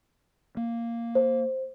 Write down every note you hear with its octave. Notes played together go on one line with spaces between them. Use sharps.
A#3
C5